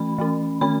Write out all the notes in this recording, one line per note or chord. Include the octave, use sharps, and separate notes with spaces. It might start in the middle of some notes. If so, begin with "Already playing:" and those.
Already playing: E3 A3 C#4 B5
E3 A3 C#4
D#3 A3 C#4 B5